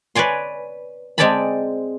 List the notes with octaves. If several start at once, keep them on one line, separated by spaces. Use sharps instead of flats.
B4 C#5 D5 G#5 C6
G#3 C4 D5 G#5 A5 B5